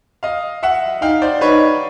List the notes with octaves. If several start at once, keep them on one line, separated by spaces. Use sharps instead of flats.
D#5 F5
E5 F#5
D#4 F5 G5
C5 D5
D#4 B4 C#5